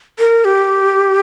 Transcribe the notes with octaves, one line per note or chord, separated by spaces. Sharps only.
A#4
G4